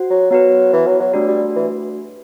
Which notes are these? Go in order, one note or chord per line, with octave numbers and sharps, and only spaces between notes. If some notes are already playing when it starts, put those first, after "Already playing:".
Already playing: F#4 C5 F#5
F#3
F#3 B3 F#4 B4
E3
F#3
F#3
G3 A3 D4 F#4
G3
E3